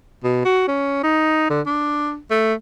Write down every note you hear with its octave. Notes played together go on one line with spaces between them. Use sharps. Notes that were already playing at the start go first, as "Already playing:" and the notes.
B2
F#4
C#4
D#4
D3
D4
A3